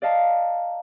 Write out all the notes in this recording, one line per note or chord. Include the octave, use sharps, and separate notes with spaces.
D5 D#5 F5 A5 A#5